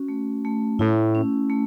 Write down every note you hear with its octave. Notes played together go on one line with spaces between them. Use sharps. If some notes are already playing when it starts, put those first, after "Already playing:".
Already playing: C#4 F#4
A3
A3
A2 E4
C#4
A3